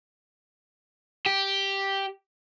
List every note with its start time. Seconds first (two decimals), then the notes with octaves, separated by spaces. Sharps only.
1.26 G4